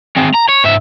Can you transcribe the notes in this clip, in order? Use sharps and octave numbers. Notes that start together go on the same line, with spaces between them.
G#3 C4
A#5
C#5
G#2 E5